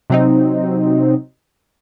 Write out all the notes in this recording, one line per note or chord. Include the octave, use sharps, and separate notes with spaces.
C3 F#3 C4 D#4